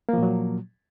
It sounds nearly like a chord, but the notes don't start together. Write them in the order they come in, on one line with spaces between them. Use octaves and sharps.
A#3 F3 A#2 F#3